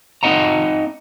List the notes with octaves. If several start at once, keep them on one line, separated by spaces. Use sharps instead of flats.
C4 D#4 D#5 F#5 A#5